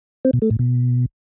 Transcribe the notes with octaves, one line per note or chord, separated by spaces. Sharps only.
C4
B2
A3
A2
B2